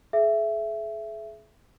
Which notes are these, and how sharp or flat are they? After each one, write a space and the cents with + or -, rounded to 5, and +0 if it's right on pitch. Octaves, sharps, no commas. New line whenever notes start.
G#4 +40 E5 +15